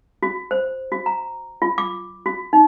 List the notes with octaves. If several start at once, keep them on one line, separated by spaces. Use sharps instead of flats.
F#4
C5
F#4
A#5
F4
D6
F#4
D#4